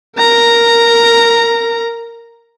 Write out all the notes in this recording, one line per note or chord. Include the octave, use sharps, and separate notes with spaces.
A#4 A#5